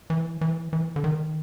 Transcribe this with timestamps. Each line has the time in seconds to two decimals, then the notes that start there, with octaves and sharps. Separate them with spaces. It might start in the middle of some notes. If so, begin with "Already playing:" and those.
0.10 E3
0.41 E3
0.73 E3
0.96 D3
1.04 D#3